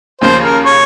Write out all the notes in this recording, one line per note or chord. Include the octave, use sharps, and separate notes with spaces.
D#2 C#3 F3 A#3 C5
A#4
C#5